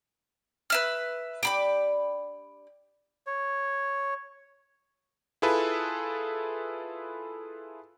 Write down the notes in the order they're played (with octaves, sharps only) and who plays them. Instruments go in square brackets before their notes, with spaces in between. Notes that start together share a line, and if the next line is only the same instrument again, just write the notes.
[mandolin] B4 E5 F6
[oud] D4 G4 [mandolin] G5 B5 D6
[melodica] C#5
[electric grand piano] E4 F4 G#4 A4 B4